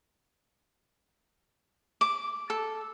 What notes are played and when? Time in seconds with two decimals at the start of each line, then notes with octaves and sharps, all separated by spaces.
2.01 D6
2.50 A4